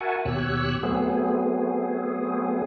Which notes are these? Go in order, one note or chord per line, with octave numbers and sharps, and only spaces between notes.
F#4 A#4 E5 F#5 G#5 A5
D#2 B2 G4 C#5 E6 F#6
F#3 A3 B3 C4 G#4